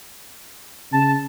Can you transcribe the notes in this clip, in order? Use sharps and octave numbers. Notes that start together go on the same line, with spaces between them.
C#3 A5